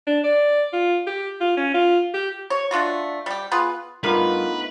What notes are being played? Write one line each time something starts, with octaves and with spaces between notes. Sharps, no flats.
D4
D5
F4
G4
F4
C#4
F4
G4
C#5
A3 D4 F4 F#4
G3 G4
B3 F4 G#4 B4
G2 A3 B3 D#4 F4 A#4 B4